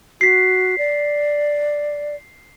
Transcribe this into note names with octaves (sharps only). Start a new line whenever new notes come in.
F#4 B6 C7
D5